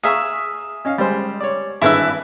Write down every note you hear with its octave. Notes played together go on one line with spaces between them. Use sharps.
G#4 E5 F5 A#5 C#6
C#4 D#5 F5
G3 G#3 C5
C#5 D5
G#1 G2 E4 B4 E5